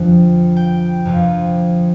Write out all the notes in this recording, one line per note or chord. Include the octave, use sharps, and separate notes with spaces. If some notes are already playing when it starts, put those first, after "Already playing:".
Already playing: F2 D3 F3
G5
F2 D3 F3